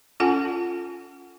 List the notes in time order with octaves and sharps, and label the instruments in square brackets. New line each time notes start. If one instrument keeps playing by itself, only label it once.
[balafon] C#4 F4 A4 F#5 G#5